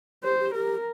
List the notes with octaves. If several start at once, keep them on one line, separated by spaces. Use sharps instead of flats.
G4 C5
G4
G4 A#4